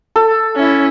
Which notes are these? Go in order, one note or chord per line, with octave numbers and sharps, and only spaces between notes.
A4
C#4 E4